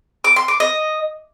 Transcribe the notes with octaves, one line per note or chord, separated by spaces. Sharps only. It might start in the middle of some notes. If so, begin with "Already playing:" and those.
D6
C6
D6
D#5